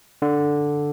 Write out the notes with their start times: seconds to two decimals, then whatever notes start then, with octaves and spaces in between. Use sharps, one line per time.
0.22 D3